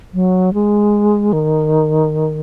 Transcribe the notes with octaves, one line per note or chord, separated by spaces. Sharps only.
F#3
G#3
D#3